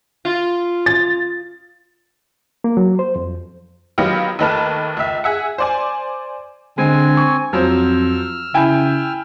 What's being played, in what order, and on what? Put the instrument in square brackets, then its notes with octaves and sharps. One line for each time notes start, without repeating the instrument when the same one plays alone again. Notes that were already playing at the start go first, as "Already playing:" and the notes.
[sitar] F4
[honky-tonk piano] A6
[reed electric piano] A#3
F#3
C5
F2
[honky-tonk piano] D#3 F#3 B3 F4 G4
D#2 A3 D#4 B4 A5 F6
C#2 E5
G#4 E5 F#5
C5 D5 G#5
[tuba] D3 [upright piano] G#3 [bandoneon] C4 G#5
[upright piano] C#6
[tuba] F2 [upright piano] F3 F#3 C5 [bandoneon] E6 F6
[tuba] C#3 [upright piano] E4 G5 G#5